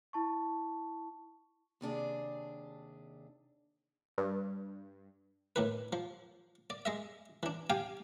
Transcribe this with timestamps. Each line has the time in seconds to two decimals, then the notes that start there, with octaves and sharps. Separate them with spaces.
0.13 E4 A5 C#6
1.81 D#2 C3 D4 G#4
4.18 G2
5.56 A2 D#3 B4
5.93 F3
6.70 D5
6.85 G#3 D#5 E5
7.43 E3 D4
7.70 G4 F5 G5 G#5